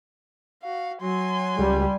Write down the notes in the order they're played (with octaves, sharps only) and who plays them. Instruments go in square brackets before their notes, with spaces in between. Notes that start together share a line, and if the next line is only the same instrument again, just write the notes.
[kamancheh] F#4 F5
[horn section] F#3 [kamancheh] G#5 C6
[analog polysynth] C#2 [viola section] G3